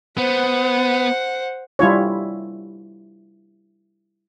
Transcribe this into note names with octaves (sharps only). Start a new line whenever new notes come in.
B3 C5 F#5
G3 E4 F4 C#5